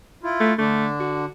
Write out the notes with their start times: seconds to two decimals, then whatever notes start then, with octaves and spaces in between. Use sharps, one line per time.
0.23 E4 F4
0.40 A3
0.58 D3 A3 D4
1.00 F#4